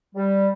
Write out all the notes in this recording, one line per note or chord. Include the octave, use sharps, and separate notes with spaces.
G3